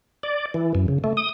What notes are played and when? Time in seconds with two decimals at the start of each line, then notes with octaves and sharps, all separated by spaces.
0.23 D5
0.54 E3
0.75 F#2
0.88 C#3
1.04 A3
1.17 D#6